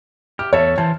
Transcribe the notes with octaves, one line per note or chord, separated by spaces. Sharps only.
G4 F6
E2 A4 C#5 E5
E3 C5 C#5 A5